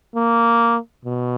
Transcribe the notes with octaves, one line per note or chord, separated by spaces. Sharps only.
A#3
B2